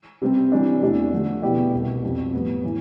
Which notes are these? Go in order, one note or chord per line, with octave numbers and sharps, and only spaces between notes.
C3 G3 C4
C3 E3 G3 D4
E2 C3 E3 A3 D4
D3 F3 A3
B2 B3 E4 G4 D5
C2 B2 B3
F2 C3 F3
A2 G3 B3
A2 E3 A3